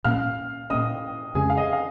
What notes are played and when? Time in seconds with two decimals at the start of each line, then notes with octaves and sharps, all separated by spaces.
0.05 A#2 A#3 C#4 F5 F6
0.70 A#2 A#3 C#4 D#5 D#6
1.35 F2 C#3 G#3 C#4 G#4 G#5
1.50 F5
1.57 D#5
1.73 F5